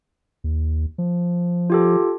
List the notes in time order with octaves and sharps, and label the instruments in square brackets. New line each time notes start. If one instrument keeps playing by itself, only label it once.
[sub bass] D#2
F3
[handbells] F4 G4 A4